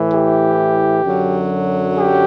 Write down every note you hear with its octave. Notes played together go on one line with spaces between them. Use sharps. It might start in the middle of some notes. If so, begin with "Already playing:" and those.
Already playing: A2 E3
G4
F#2 D3 F#3
G4